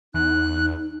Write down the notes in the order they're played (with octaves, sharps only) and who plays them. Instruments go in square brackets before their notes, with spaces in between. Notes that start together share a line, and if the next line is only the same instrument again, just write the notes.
[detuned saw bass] E2 [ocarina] D#4 [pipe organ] F#6